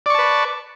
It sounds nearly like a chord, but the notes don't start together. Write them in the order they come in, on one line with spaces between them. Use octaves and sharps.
D5 C#6 A5 B4